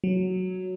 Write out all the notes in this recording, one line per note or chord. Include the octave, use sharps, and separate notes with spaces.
F#3